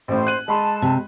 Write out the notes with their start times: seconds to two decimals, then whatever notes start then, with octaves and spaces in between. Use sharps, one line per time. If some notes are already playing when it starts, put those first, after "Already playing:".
0.08 A1 A2 C5
0.27 F#6 D#7 F#7
0.48 G#3 A5 B5 C6
0.82 C3